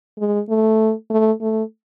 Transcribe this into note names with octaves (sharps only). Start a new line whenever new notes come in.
G#3
A3
A3
A3